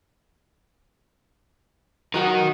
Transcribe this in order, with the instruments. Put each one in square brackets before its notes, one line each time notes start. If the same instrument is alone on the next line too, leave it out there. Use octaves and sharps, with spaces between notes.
[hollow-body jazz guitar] B1 F#4 F#5 [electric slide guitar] D#4 A#4